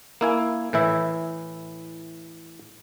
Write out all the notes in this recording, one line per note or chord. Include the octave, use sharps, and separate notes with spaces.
A#3 E4 G#5
A2 E3 E4 E5